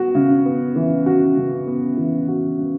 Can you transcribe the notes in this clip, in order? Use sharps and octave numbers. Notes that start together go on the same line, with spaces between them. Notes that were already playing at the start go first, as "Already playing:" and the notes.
Already playing: B3 F#4
C#3
B3
E3
F#4
C#3
B3
E3
F#4
C#3